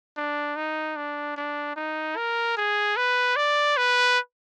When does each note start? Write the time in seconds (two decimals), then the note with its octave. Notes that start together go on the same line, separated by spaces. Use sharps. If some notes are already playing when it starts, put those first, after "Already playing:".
0.17 D4
0.56 D#4
0.97 D4
1.37 D4
1.76 D#4
2.17 A#4
2.57 G#4
2.97 B4
3.36 D5
3.77 B4